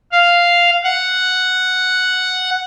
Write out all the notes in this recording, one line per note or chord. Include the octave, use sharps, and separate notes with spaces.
F5
F#5